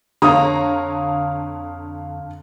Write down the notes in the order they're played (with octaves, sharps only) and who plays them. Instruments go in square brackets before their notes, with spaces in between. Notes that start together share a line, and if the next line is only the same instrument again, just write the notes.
[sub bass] F2 [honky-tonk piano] D3 C#5 A#5 [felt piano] F5 D#6